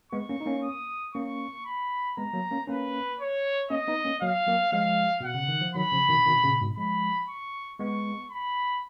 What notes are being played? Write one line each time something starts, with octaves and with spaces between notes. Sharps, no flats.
G#3 B3 C#6
A#3 C#4
D#4
A#3 C#4
D#6
A#3 C#4 C#6
B5
G#3 B3 A#5
F#3 A#3
A#3 C#4
A#3 C#4 B4
C#5
A#3 C#4 D#5
B3 D#4
A#3 C#4
F#3 A#3 F5
F#3 A#3
F3 G#3 F5
B2 F#5
C#3
D#3
F3
D#3 F#3 B5
C#3 F3
B2 D#3
B2 D#3
A#2 C#3
G#2 B2
F3 G#3 B5
C#6
G#3 B3 C#6
B5